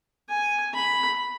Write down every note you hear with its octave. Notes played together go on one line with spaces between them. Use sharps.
G#5
B5